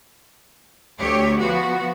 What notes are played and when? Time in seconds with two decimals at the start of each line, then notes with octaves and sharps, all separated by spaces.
0.99 D2 G4 C#5
1.39 F3 B3 F#4